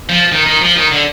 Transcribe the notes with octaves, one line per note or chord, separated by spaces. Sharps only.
F3
D#3
D#3
F3
D#3
D3